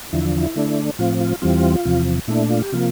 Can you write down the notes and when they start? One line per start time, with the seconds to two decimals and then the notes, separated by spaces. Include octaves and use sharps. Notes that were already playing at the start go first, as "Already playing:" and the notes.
0.13 E2 D3 F3 E4
0.38 E4
0.56 D3 A3 D4
0.99 A2 F3 C4 F4
1.21 F4
1.42 E2 E3 G3 C4 F4
1.85 E2 C3 F3
2.28 A#2 A3 D4 E4
2.50 F4
2.62 G4
2.72 C3 F3 A#3 F4